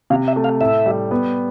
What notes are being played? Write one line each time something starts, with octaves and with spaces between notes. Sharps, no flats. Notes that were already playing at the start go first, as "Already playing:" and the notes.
C3 F5
E5
A3
F5
A2 E5
G3
B3